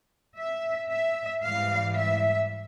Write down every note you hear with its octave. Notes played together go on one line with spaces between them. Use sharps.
E5
E5
G#2 E3 G3 F5
E5